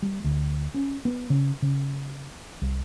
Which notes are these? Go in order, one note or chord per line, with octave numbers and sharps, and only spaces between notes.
G3
D2
C#4
B3
C#3
C#3
C2